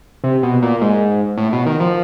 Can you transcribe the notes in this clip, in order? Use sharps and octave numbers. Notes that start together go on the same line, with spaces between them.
C3
B2
A#2
G#2
A2
B2
D#3
F3